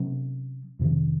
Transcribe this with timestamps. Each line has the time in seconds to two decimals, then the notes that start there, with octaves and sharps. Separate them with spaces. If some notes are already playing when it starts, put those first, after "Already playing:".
Already playing: C3 F#3 C#4
0.79 F2 C3 D#3